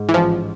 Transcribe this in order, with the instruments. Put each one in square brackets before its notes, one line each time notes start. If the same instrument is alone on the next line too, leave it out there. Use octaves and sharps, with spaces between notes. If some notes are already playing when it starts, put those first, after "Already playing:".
Already playing: [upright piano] G#2
[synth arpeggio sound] E3
[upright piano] A1 [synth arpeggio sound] F3